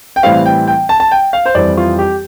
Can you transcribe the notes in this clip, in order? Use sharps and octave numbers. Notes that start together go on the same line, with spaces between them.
G5
A2 E3 G3 C4 F5
G5
G5
A5
A5
G5
F5
C5
F2 E3 G3 C4 D5
F4
G4